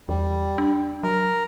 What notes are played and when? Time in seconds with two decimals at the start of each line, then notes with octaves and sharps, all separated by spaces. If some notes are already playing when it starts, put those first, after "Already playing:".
0.09 E2 G3
0.58 D4
1.03 F#3 A#4